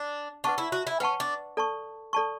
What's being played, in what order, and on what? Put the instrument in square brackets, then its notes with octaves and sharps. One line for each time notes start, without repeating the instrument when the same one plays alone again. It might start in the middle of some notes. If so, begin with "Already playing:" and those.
Already playing: [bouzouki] D4
[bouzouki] D4 [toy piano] B4 F#5 A5 C#6
[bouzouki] E4
F#4
E4
[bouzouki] C#4 [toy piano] B4 F#5 A5 C#6
[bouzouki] D4
[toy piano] A4 D5 A5 C#6
A4 D5 A5 C#6